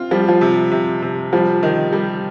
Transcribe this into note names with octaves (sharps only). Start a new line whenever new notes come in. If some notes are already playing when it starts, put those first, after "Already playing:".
Already playing: C4 F4
F3 G3
F3
C3
C3
C3
F3 G3
D#3
G3